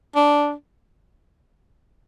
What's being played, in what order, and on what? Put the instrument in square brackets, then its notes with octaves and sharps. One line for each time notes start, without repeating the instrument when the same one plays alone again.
[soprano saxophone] D4